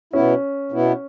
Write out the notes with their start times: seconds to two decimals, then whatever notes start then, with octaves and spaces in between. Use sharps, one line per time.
0.13 B2 B3 C#4 E4
0.72 B2 B3 E4